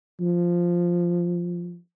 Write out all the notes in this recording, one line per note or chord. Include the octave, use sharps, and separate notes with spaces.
F3